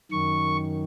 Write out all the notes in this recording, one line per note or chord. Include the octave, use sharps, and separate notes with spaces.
F#2 D#3 C#6